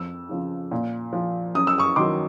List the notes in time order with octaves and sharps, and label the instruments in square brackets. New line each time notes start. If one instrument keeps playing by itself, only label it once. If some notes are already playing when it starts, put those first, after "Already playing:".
Already playing: [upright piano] F2 E6
C#3 F3
A#2
F3
F#2 D#6
E6
C#6 D#6
D#3 F#3 C6 D6